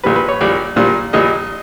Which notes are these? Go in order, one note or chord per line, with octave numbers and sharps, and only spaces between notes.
A#1 A#2 G3 B4
B4
C#5
A#1 A#2 G3 D5
A#1 A#2 G3
A#1 A#2 G3 D#5